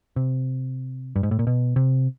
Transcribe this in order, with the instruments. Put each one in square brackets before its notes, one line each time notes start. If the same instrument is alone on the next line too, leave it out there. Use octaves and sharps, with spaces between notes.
[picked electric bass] C3
G2
G#2
A2
A#2
B2
C3